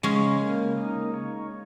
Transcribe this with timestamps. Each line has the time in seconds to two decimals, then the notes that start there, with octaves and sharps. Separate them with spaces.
0.03 C#3 G#3 C#4
0.41 A#3
0.77 D#4
1.14 C#5